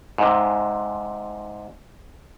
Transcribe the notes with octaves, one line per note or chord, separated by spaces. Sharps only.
G#2 C3